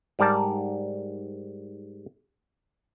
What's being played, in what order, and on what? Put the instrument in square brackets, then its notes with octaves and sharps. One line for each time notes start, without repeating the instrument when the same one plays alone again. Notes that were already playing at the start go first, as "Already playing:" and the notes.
[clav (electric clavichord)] G#2 G3 A#4 D5 A5